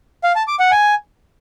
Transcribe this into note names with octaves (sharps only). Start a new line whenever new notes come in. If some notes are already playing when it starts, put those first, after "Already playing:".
F5
A5
D6
F#5
G#5